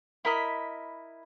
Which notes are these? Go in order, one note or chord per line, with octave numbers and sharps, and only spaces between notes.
E4 A#4 D#5 B5